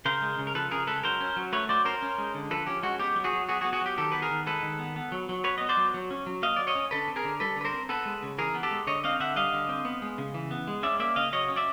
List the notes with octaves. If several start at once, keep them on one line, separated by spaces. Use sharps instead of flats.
C#3 A#4 C5
G#3
C#3
A#4
F3 A4 B4
C#3 G#4 A#4
G#3 A4 B4
F#3 A#4 C5
C#4
F#3
A3 B4 C#5
F#3 C5 D5
C#4 A#4 C5
C#4
G#3
D3
F3 A4 B4
C#4 G4
G#3 F#4
B3 G4
F#3
F#4 G#4
F#3
B3 F#4 G#4
F#4 G#4
B3
F#4 G#4
F#3 G4
D#3 G4 A4
B3 B4
G#4 A#4
D#3
G#3 A4 B4
D#3
B3
B3
F#3
F#3
B3 B4 C#5
B3 D#5
C5 D5
F#3
F#3
C#4
F#3
A#3 D#5 F5
F#3 D5
C#5 D#5
C#4
D3 A4 B4
C4
G#4 A#4
D3
G3 A4 B4
D3 B4
A#4 C5
C4
B3 A4 B4
G#3
C#3
E3 G#4 A#4
B3
G4 A4
G#3
D3 C#5 D#5
C4 D#5 F5
D3 E5 F#5
G3 D#5 F5
D3
C4
B3
G#3
C#3
E3
B3
G#3
C#4 D5 E5
A#3 D5 E5
C#3 D#5 F5
F#3 C#5 D#5
C#4
D5 E5